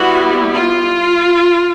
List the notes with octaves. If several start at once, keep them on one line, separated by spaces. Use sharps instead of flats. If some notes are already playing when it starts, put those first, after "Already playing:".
Already playing: G3 B3 E4 F#4
F4